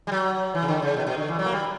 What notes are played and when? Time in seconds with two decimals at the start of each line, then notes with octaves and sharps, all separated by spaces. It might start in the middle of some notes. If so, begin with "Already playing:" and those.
0.07 G3
0.12 F#3
0.55 E3
0.62 C#3
0.68 D3
0.82 C#3
0.97 B2
1.07 B2
1.17 D3
1.28 E3
1.39 F#3
1.46 A#3
1.52 G3